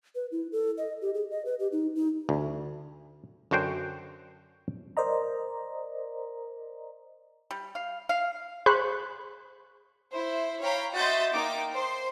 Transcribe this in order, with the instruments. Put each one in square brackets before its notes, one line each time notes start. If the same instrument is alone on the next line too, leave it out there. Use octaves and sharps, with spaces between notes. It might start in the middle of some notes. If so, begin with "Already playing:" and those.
[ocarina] B4
E4
A4
D#5
G4
G#4
D#5
B4
G4
D#4
D#4
[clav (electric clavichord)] D2
F#2 D3 F#4 C5 G5
[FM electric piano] A#4 C5 D5 D#5 A#5
[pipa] G3
F5
F5
[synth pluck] G#4 C5 B5 C#6 F#6
[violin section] E4 C5
C#5 F5 G5 A#5 B5
F#4 D#5 E5 C6 G6 A6
A#3 D#4 G5 D6
C5 C6